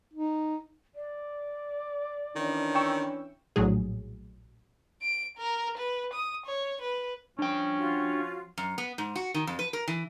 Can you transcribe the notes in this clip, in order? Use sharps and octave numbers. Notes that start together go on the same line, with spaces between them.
D#4
D5
D#3 E3 C#4 D4
G5 C#6 E6
A#1 A2 F#3 G#4
D7
A#4
B4
D#6
C#5
B4
F3 C#4 D4 G5
F4 F#4
F#2
B3
G#2
F#4
D#3
F2
B4
A#4
E3